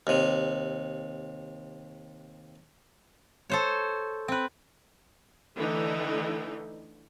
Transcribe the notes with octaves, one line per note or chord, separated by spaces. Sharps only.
D#2 C3
A4 C5 C#5
C4 B4
D3 E3 A3 D#4